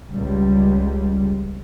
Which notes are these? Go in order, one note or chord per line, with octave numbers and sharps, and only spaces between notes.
C#2 G3